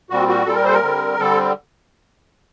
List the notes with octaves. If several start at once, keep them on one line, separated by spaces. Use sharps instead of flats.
A#2 G3 C4 F#4
F#4
A#2 G3 C4 A4
A#4
C5
A4
A#4
D3 G3 C4
D3 G3 C4 A4